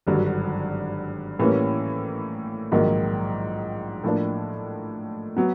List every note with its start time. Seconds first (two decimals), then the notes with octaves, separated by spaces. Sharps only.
0.07 G#1 G2 D3 F#3
1.39 A2 E3 G3 A#3 C#4
2.72 A#1 G#2 D#3 F#3 A#3
4.04 A2 F3 A#3 D4
5.37 F#3 B3